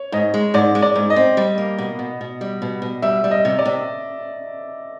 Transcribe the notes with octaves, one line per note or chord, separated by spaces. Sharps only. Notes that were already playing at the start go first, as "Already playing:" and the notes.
Already playing: C#5
G#2 D#5
G#3
G#2 D5
G#3
D5
G#2
D#5
C4
G3
A#3
B2
B2
B2
G3
B2
B2
G3 E5
G3
D#5
C3
D5
C3